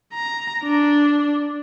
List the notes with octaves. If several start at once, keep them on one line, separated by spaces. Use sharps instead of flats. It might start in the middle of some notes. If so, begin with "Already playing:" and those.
A#5
D4